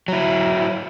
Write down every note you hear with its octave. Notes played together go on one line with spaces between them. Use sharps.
F#3 E4